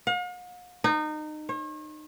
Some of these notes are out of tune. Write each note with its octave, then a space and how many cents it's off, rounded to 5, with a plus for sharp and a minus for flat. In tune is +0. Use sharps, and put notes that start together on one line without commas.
F5 +45
D#4 -25
C#5 -45